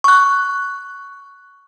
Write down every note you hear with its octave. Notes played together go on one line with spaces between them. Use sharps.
C#6 F#6